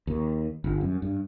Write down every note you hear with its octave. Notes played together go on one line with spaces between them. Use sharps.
D#2
G1
F#2
G2